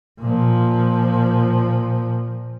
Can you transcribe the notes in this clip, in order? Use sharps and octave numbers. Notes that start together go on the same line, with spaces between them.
A#2 F3